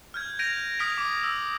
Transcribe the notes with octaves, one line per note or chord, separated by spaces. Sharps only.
F6 G6 G#6
G6 G#6 A#6 D7 D#7 F7
D#6 F6 B6 D7 F7
D6
E6